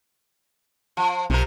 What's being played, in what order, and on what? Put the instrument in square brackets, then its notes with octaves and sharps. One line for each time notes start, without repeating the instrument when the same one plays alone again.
[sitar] F3
[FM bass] B1 [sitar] C3 F3 A#4